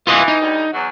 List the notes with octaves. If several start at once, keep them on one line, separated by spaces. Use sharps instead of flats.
E3 F4 B4 D#5
D#4
D2 G3
E2 F#3